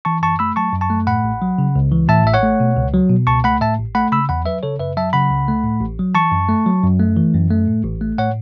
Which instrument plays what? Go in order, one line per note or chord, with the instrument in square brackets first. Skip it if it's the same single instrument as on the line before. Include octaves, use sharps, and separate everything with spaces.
[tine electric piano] E3 A5 C#6
F#2 A5 C#6
A3 B5 E6
F#3 A5 C#6
F#2
A5 C#6
A3
A2 F#5 B5
A1
F#3
C#3
C#2
E3
A2 E5 A5
A1 E5
C#5 F#5
A3
B2
C#2
F#3
B2
C#2 A5 C#6
A3 F#5 B5
A2 E5 A5
A1
A3 F#5 B5
C#3 B5 E6
E2 F#5 B5
F#3 B4 E5
C#3 A4 C#5
F#2 B4 E5
F#3 E5 A5
C#3 F#5 B5
C#2
A3
A2
A1
F#3
E3 A5 C#6
F#2
A3
F#3
F#2
A3
E3
F#2
A3
A2
A1
A3
A2 C#5 F#5